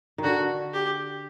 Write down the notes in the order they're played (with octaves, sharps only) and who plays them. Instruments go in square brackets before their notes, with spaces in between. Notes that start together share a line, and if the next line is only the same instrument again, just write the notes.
[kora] D#3
[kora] D3 [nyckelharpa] F#4
[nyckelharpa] G4